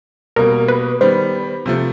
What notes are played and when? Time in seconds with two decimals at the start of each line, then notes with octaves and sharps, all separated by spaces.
0.36 B2 G3 A#3 A#4
0.68 B4
1.01 D#3 G3 B3 C5
1.66 C3 F3 A3